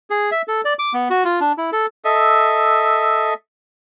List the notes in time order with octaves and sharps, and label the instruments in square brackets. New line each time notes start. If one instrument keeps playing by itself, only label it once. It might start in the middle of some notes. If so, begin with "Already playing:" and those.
[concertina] G#4
E5
A4
D5
D6
B3
F#4
F4
D4
E4
A4
[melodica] A4 D#5 E5